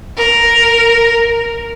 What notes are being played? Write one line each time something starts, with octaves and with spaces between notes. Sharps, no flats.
A#4